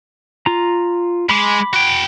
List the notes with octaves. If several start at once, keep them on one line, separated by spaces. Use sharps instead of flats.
F4 A#5
G#3 B5 D6
F#4 G5